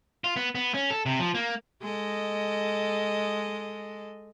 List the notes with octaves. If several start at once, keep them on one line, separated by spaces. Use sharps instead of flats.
F4
B3
B3
C#4
A4
C3
F3
A#3
G#3 A4 D#5